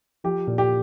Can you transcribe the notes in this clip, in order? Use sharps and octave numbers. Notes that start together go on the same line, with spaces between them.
F3 G4
A#2
G4